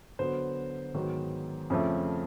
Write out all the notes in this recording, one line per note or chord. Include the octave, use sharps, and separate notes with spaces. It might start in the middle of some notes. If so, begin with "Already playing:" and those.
D3 F#3 B3 C5
G#2 D#3 F#3 B3
F2 C#3 F3 A3